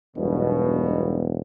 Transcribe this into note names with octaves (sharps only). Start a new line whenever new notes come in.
E1 B1 G2 B2